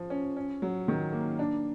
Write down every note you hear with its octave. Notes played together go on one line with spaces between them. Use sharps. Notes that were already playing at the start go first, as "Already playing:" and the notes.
Already playing: F3
C#4
C#4
F#3
D#3
A#3
D4